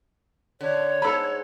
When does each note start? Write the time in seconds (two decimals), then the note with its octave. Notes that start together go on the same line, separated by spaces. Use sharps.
0.61 D3 C#5
1.02 G#2 A4 B5